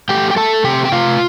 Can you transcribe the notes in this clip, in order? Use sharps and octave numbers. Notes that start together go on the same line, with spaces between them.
A3 G4 G5
G5
A3 A4 A5
C3 G4 G5
G5
C3 F4 F5